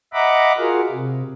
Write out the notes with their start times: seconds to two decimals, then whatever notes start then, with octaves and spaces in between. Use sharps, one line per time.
0.13 D#5 E5 F#5 A#5 B5 D6
0.58 F4 F#4 G#4 A#4 F5
0.91 C3